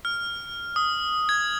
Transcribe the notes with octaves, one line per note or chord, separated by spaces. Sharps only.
F6
D#6
G#6